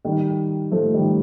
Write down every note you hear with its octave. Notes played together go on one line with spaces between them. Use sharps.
D#3 G3
F3 A3
D#3 G3